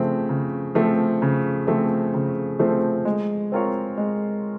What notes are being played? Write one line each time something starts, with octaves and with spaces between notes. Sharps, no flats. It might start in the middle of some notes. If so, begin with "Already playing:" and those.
Already playing: C#3 F3 A3 C4
C#3
F3 A3 C4
C#3
F3 A3 C4
C#3
F3 A3 C4
G#3
C4 F4 A#4 C#5
G#3